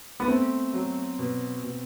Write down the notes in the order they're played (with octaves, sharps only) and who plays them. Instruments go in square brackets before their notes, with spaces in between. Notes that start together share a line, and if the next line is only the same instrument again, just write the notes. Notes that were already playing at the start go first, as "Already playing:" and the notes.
[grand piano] B3
[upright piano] A3 [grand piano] C4
[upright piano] F#3
B2
B2